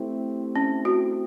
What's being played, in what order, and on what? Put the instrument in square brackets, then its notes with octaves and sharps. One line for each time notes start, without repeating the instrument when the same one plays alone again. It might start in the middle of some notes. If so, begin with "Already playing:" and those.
Already playing: [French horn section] A3 C4 E4 G4
[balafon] C#4
F#4